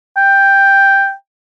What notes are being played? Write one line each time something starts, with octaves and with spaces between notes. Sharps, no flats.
G5